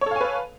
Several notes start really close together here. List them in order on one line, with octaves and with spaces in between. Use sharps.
C#5 A4 F5 G#5 B4